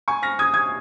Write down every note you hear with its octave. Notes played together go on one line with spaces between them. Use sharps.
G#5 C#6
F6 A#6
D#6 G#6
D#6 G#6